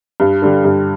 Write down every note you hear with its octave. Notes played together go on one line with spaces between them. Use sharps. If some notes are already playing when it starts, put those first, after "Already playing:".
G2
D3 G3
G2